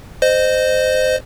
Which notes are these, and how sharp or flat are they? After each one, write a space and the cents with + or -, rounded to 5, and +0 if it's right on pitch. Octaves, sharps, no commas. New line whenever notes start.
C5 -15 D#5 -20